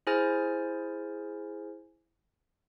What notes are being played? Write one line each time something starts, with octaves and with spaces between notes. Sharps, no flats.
E4 G#4 C5 G#5 F6 A6